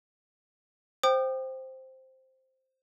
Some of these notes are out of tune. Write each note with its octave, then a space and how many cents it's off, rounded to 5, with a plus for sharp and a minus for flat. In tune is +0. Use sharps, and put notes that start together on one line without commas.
C5 +0 G5 +0 D#6 -45